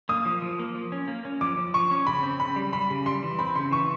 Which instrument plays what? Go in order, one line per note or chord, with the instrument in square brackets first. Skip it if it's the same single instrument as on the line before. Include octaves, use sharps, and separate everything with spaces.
[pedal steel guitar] A#3 [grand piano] D#6
[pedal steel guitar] F3
F3
A#3
F3
C#4
A#3
C#4
[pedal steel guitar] F3 [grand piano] D6
[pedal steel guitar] F3
[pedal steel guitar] F3 [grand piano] C#6
[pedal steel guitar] C#4
[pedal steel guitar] C#3 [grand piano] B5
[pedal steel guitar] C4
[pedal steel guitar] C#3 [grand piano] B5
[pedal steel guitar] G3
[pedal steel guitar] G3 [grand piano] B5
[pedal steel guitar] C#3
[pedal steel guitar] G3 [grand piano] C6
[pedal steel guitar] E3
[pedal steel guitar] C4 [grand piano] B5
[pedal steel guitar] C#3 [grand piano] C6
[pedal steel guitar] E3 [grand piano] C#6